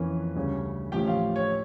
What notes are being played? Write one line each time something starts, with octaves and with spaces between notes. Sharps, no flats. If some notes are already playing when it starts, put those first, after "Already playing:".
Already playing: F2 E3 A#3 C#4
D2 C#3 G3 C#4
A1 A2 F3 C#4 G4 G5
F4 F5
C#5